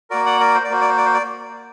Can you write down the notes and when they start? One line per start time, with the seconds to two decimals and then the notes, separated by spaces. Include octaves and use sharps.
0.10 A#3 F#4 A#4 D5
0.26 D5 F#5
0.40 A#4 D5
0.55 C5
0.64 D5
0.70 A#3 F#4 C5
0.81 D5
0.89 C5
0.97 D5
1.06 C5
1.14 D5